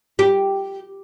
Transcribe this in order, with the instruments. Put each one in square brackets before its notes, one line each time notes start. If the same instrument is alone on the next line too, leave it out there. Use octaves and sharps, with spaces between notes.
[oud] G4